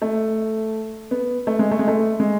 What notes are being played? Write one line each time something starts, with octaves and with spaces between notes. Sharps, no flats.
A3
B3
A3
G#3
A3
G#3
A3
G#3